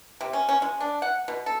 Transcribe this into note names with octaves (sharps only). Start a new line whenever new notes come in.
C3
C#4
C#4
G#3
D4
F#5
B2
A4